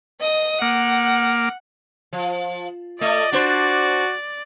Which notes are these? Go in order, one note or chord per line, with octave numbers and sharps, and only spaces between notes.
D#5 D#6
A#3 F#5 D6 F6
F3
A3 D5 D#5
D4 F#4 C5